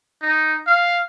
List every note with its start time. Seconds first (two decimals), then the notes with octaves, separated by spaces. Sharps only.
0.22 D#4
0.67 F5